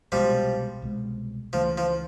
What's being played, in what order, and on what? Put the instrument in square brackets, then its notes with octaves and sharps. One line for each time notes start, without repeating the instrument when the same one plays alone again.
[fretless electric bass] C2 B2 G#3 [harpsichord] F3 G3
[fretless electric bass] C2 B2 G#3
[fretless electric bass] C#2 C#3 E3 A3 [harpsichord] F3
[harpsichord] F3